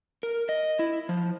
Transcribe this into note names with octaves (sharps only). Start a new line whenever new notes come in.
A#4
D#5
E4
F3